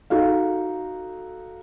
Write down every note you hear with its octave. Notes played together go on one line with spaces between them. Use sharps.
D#4 F#4 A4 F5